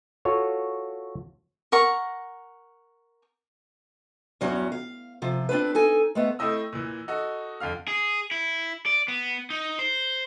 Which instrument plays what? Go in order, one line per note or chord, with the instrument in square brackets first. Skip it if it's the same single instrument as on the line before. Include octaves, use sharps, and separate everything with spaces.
[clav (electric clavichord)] F4 F#4 A4 C#5
[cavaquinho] A#4 F#5 C#6
[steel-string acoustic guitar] E2 G2 F#3 G3 C#4
F5
C3 F3
C4 D4 F4 B4
D#4 A4 G#5
G#3 A3 B3
[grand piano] A3 C4 E4 D#5 E6
A#2 E3
D#4 F#4 A4
F2 D3 F5 F6
[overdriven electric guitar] G#4
E4
D5
B3
D#4
C5